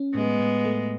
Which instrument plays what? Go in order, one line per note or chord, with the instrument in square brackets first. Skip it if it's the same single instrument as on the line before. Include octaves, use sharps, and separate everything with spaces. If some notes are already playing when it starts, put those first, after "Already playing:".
Already playing: [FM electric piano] C#4
[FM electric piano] A2 [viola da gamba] G#3 B3
[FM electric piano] A2
A3